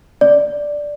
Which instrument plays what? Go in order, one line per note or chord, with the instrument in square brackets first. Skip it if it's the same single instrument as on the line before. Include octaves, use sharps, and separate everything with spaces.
[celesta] D5